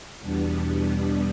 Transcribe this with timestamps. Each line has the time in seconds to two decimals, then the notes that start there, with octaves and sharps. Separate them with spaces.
0.21 E2 B2 G3 B3 D4